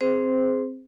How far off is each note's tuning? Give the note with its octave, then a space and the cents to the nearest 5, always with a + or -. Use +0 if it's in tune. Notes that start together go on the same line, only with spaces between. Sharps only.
C4 +0 G#4 +0 C5 -15